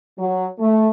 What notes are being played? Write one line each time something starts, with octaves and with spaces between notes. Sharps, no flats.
F#3
A3